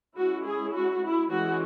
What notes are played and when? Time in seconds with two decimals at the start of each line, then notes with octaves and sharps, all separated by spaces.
0.17 G#3 C#4 E4 F#4
0.46 G#4
0.75 F#4
1.03 E4
1.30 E3 G#3 C#4 E4 F#4